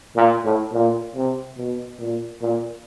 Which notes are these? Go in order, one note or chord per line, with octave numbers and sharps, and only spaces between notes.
A#2
A2
A#2
C3
B2
A#2
A#2